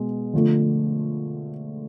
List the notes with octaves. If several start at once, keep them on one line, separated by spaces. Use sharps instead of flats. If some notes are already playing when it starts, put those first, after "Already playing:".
Already playing: B2 G#3
D3 F3 A3